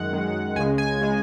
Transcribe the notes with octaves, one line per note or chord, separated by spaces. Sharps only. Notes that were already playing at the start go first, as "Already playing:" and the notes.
Already playing: F#2 D#3 G#3 F#5
F#2 D#3 G#3
C#2 C#3 G#3 G#5
G#5
C#3 G#3